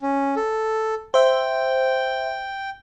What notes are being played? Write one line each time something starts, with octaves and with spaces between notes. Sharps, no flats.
C#4
A4
C5 E5 G5